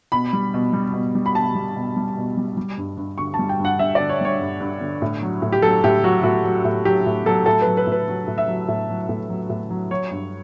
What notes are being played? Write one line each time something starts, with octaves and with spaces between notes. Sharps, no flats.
B2 B5
G3
B2
G3
B2
G3
B5
B2 A5
G3
B2
G3
B2
G3
G3
G2
G2
D3 C#6
A5
G3
G5
G2
F#5
G2 E5
D3 D5
C#5
G3 C#5
G2
G2
D3
A2
F#3
A2
G4
F#3 A4
A2 G4
F#3 F#4
A2 F#4
F#3
A2
F#3 G4
A2
F#3 A4
A2 A4
B4
F#3
B4
A2
B4
F#3
A2
E5
F#3
A2
F#3
A2
F#3
A2
F#3
F#3 C#5
G2